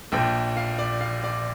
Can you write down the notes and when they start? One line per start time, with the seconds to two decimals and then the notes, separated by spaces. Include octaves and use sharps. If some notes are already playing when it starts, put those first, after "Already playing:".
0.12 A#1 A#2 F3 G5
0.57 F5
0.79 D5
1.01 F5
1.24 D5